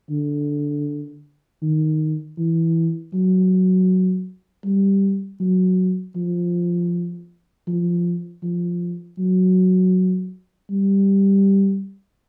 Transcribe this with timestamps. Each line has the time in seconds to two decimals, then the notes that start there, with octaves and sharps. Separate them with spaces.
0.10 D3
1.62 D#3
2.38 E3
3.14 F#3
4.65 G3
5.40 F#3
6.16 F3
7.67 F3
8.43 F3
9.18 F#3
10.71 G3